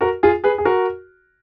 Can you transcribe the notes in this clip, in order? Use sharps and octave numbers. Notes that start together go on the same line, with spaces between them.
F#4 A#4
F4 G#4
G#4 B4
G#4
F#4 A#4